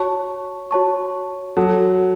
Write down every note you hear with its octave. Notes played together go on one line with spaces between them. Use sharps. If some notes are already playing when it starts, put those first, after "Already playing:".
Already playing: F#4 C#5 A5 C#6
F#4 C#5 A5 C#6
F#3 F#4 A4 F#5 A5